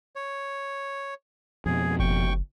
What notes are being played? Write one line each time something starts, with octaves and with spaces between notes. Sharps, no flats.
C#5
F2 B2 G#4
F#1 G5 C#6